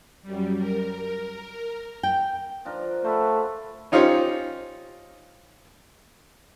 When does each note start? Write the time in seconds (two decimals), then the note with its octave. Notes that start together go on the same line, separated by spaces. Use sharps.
0.23 F#2 G3
0.58 A#4
2.03 G5
2.65 F3 D4 A#4
3.04 A3 C5 F#5 B5
3.92 C#4 D#4 F4 G4 C5 C#5